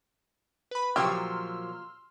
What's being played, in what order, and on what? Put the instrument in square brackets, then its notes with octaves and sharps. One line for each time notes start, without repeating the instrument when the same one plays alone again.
[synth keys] B4 B5
[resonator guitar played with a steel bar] A#2 F3 F#3 [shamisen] G4 [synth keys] C6 E6 F6